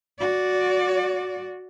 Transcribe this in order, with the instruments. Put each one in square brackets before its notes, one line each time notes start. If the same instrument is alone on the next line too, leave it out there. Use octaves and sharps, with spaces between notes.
[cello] F#4 D5